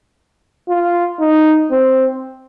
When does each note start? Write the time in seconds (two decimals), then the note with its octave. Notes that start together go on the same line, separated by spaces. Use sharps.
0.69 F4
1.20 D#4
1.71 C4